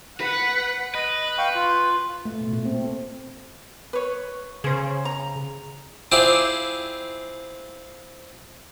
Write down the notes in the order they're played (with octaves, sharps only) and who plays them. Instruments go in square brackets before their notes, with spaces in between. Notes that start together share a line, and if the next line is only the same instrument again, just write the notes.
[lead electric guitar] B4 [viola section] F#5
[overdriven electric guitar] B4 [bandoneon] D#5
[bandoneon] F5 G5 C#6
F4
[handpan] A3
B2
A#2
C4
[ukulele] B4 C#5
[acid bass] C#3 [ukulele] G#4 C5
[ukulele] A#5
[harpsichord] C4 E4 F4 G#4 D5